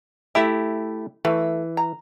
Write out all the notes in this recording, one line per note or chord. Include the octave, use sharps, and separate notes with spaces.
A3 E4 G4 E5
E3 A3
A#5